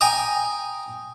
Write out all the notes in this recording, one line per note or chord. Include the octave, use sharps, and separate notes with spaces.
G5 G#5 A#5 D#6